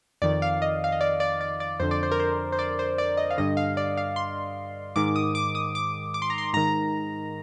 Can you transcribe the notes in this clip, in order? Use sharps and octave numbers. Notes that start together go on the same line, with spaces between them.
F2 D#3 D5
F5
D#5
F5
D#5
D5
D5
D5
D5
F2 D3 C5
D5
C5
A#4
C5
C5
D5
C5
D5
D#5
F5
G2 D3 D#5
F5
D5
F5
C6
G#2 D#3 D6
D#6
D6
D#6
D6
D6
C6
A#5
C6
G#2 D#3 A#5